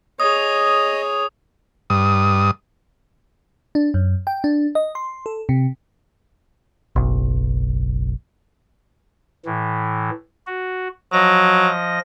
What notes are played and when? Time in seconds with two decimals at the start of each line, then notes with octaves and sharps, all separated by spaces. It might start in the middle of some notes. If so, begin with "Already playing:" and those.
0.20 G#4 C#5 D#5 D#6
1.90 G2 D#6
3.75 D4
3.94 F#2
4.27 G5
4.44 D4
4.75 D#5
4.95 C6
5.26 A4
5.49 C3
6.96 F#1 B1
9.45 A2 E3
10.47 F#4
11.13 F3 F#3 D#5 A#6